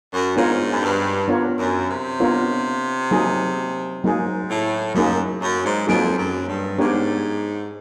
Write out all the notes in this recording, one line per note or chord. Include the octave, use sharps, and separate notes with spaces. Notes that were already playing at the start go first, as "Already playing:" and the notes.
F#2
G#2 B3 D4 F4 A#4 C#5
F#2
G2
B3 D4 F4 A#4 C#5
F#2
C3
B3 D4 F4 A#4 C#5
F#3 A#3 D#4 G#4
G#2 F#3 A#3 D#4 G#4
A2
F#2 F#3 A#3 D#4 G#4
F#2
G#2
F2 F#3 A#3 D#4 G#4
F#2
G2
G#2 B3 D4 G4 A#4 C#5